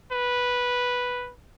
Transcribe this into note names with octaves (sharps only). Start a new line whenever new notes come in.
B4